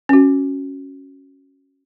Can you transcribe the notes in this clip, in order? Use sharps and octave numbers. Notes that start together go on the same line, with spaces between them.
C#4 F#4